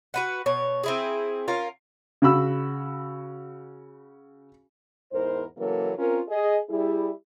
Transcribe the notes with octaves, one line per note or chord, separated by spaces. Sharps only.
F#4 B4 F#5
B2 C#5
C4 E4 G#4
C#4 F4 A#4
C#3 F#4 B5 E6
E2 G#2 A#4 C5
C#3 E3 F#3 A#3 A4 A#4
C4 C#4 F4 A#4
G#4 D#5
G3 E4 G#4